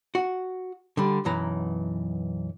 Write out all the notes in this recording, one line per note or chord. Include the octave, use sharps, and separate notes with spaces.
F#4
D3 G3
B1 F#2 E3 A#5